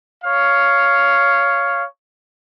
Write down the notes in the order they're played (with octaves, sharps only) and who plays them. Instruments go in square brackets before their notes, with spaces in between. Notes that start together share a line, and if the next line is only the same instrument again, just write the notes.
[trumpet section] C#5 F5